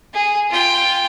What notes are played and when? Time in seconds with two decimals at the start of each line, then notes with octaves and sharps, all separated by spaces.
0.14 G#4
0.50 F4 G5